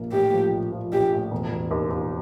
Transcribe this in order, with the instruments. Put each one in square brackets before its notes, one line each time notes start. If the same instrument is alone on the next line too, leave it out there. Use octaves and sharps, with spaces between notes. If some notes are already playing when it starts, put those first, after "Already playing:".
Already playing: [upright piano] A#1 A#3
[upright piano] A2 [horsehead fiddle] G4
[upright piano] F3
A#1
F3
[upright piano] A#1 [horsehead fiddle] G4
[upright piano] A2
E1
E1
D#2
D#2